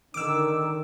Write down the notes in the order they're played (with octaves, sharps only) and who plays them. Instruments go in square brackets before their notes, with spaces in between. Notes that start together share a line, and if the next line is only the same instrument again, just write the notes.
[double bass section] D3 D#3 [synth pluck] D6 E6